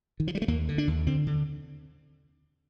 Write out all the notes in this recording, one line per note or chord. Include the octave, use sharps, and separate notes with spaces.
D#3
F3
G3
A3
D#2 A#3
D3
D4
D#2
D3 C4
D3